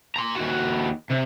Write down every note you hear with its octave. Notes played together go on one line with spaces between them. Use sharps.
A#5 C6
D#2 F#4
C3